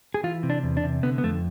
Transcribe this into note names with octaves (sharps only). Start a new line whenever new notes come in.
G#4
E3 F4
C3
D4
E2
D4
C3
D3 B3
B3
F2 A3